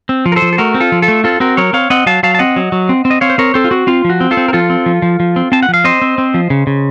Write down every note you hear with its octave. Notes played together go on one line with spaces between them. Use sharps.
C4
F3
A#4
A4 C5
F3
A4
A3 F#4 A#4
C4
F4 A4
F3
F4 A4
A3
C4 F4 A4
C4 F#4 A#4
F#3 A#4 C#5
C4 C#5 F5
C4 D#5 F#5
F#3 F5 A5
F#3 F5 A5
A5
C4 D#5 F#5
F#3
F#3
C4
C4
D#5
C4 C#5 F5
C5
C4 A#4 C#5
C4 A4 C5
F4
C4 F#4
C4 F4
F3 F#4
C4
F4 A4
C4
A#4
F3 F4 A4
C4
F3
F3
F3
C4
C4 A5
F#5
F3
F5
C4 C5 D#5
C4
C4
F3
C#3
C#3